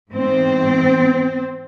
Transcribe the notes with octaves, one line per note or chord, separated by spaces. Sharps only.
G#2 E3 C4